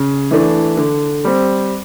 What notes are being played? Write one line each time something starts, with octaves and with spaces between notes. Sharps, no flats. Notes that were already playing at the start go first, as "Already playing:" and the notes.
Already playing: C#3
E3 A3 D4
D3
G3 C4